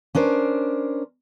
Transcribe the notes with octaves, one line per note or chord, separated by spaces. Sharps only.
C#4 D4 A#4 C5